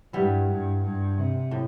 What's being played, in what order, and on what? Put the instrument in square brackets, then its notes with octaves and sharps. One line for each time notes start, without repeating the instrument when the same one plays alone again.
[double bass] G2 [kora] G3 B3 E4
[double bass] G2
G2
C3
[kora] A2